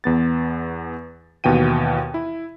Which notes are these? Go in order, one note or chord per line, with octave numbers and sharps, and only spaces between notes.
E2 B3 A6
D#2 B2 E3 G5 D#7
E4